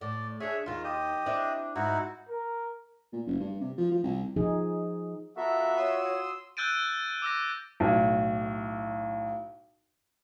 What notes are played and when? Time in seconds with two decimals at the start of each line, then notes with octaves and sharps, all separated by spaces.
0.01 A2 D5
0.40 D4 G#4 C#5 E5
0.66 D#2 D#3 F4
0.84 G4 D#5
1.26 C4 D4 E4
1.76 G#2 D#4 E4 F#4
2.29 A#4
3.13 A#2
3.27 F#1
3.40 G2
3.61 C3
3.78 F3
3.91 F3
4.04 C2
4.36 F3 D#4 G#4
5.37 B3 F4 F#4 A4 A#4 E5
5.77 C#5 C6 D#6 E6
6.57 E6 F#6 G6 A6 D7 D#7
7.22 D6 E6 A#6
7.80 B1 A2